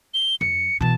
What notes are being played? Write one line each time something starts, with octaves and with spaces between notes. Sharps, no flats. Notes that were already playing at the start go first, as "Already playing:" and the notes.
G7
F2 C#7
B2 E3 A5